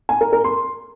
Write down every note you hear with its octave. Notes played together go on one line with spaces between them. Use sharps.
G#5
A#4
A#4
C6